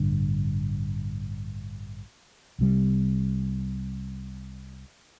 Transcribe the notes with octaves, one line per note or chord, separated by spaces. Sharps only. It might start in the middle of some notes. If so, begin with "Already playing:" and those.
Already playing: A1 G2 D3
C2 C3 G3